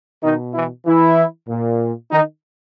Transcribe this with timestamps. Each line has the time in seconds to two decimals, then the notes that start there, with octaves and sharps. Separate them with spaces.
0.23 B2 D#3 D#4
0.54 E3 E4
0.85 E3 E4
1.48 A#2
2.11 D#3 D#4